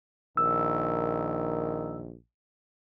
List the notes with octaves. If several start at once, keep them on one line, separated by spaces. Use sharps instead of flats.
A#1 D#3 E6